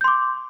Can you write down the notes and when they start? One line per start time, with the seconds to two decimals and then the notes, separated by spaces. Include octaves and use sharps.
0.01 G6
0.04 C6
0.08 D6